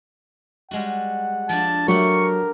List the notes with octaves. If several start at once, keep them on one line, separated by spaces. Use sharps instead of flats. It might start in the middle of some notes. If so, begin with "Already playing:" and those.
G3 G#3 F#4 F#5
F3 D4 A5
F#3 A3 G4 A#4 F#5 C#6